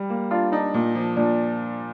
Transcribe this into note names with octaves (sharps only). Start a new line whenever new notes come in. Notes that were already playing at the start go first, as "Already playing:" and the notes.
Already playing: G3
A#3
D4 F4
D4 D#4
A#2
F3
A#2 D4